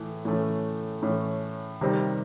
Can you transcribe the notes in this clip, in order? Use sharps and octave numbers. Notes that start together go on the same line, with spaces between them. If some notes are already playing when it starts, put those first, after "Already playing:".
Already playing: A2 E3 A3
A2 E3 A3 C#4
A2 E3 A3 C#4
C3 D#3 G3 C4